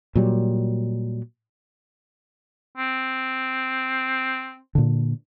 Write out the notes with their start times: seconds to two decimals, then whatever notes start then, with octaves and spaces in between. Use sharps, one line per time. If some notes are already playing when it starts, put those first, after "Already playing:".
0.15 A#2 F#3 G3
2.77 C4
4.75 A#2 D3